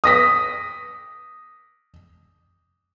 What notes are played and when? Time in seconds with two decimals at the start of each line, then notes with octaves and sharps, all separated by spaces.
0.04 D#6 A#6 B6